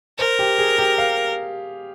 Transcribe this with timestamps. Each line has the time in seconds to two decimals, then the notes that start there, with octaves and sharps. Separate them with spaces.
0.18 A#4 C5
0.39 G4
0.59 G#4
0.78 G4
0.98 F5